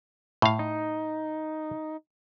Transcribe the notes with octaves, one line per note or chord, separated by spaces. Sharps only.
A2 F5
D#4